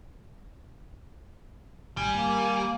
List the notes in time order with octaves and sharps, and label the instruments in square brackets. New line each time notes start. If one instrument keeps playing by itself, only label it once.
[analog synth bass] A#1 [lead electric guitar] G3 [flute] G#5
[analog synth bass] G#1 [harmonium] A#3